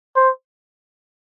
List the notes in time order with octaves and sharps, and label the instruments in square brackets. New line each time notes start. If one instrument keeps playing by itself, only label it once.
[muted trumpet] C5